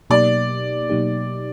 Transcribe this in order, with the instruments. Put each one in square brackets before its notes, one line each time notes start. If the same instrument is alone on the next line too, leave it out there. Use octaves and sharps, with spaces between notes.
[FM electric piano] B2 F#3 A#3 D#4 G4 [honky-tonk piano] D5
[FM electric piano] B2 F#3 A#3 D#4 G4